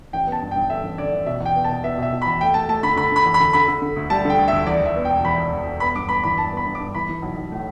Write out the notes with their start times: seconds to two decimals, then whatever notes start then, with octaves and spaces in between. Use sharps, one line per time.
0.13 A1 G5
0.27 B3
0.32 A5
0.42 G2
0.51 G5
0.56 G2
0.70 D3 E5
0.84 A1
0.98 D3 D5
1.12 A1
1.26 B2 E5
1.40 E2
1.46 G5
1.55 B3
1.64 A5
1.69 B2
1.83 B3 E5
1.97 B2
2.02 E5
2.12 B2
2.22 B5
2.27 E2
2.41 A3 G5
2.54 A3 A5
2.69 A3 A5
2.83 D3 B5
2.96 D3 B5
3.12 D3 B5
3.26 E2
3.34 B5
3.40 D3
3.53 D3 B5
3.68 D3
3.82 D3
3.96 D2
4.10 G3 A5
4.25 D3 G5
4.39 D2
4.48 E5
4.52 D2
4.67 E2 D5
4.82 E2 E5
4.96 B3
5.05 G5
5.10 E1
5.25 E2 B5
5.38 E1
5.53 E1
5.66 E1
5.80 B3 B5
5.95 G2 D6
6.09 B3 B5
6.24 E3 B5
6.38 G2 A5
6.52 B3 B5
6.66 G2
6.75 D6
6.80 G2
6.94 E3 B5
7.09 E3
7.22 B1
7.36 B1
7.52 A2